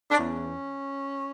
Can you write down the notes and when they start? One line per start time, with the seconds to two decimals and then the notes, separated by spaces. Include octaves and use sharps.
0.11 D4
0.17 E2 C#4